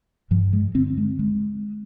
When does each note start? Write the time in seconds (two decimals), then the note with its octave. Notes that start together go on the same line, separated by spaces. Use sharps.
0.31 G2 F3
0.53 G#3
0.75 D3 C4
0.98 G#3
1.19 G#3